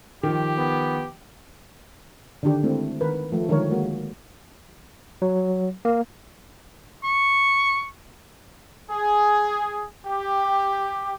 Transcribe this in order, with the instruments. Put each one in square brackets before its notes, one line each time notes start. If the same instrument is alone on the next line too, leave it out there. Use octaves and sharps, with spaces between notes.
[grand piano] D#3 F3 [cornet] G4
[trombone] B3
[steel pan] D3 D#3 D4 G4
G#3 A3 C4 E4
D#3 A#4 B4
F3 A3
D3 D#3 F3 G#3 A#4 C#5
G#3 A#3 F#4
[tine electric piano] F#3
A#3
[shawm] C#6
[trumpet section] G#4
G4